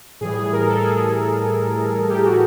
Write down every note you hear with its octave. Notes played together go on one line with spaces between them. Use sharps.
A2 E3 G3 G#4
G#4
A#4
A4
G#4
G4
F#4